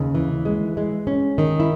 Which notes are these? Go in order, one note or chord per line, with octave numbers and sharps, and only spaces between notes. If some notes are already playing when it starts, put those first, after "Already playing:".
Already playing: D#2 C#3
E3
G#3
G#3
C#4
D#3
E4